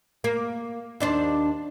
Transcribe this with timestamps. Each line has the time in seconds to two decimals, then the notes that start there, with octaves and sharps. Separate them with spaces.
0.24 A#3
1.00 D#2 D4 C5